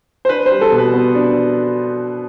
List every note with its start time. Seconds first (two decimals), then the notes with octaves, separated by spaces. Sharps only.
0.25 C5
0.29 D4 B4
0.46 G3 C5
0.61 A4
0.72 B2
0.78 B4
0.93 B3
1.15 D4